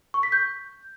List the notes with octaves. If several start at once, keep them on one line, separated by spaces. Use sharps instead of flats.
C#6
B6
G6